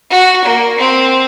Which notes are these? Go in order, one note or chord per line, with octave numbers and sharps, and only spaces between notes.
F#4
A#3
C4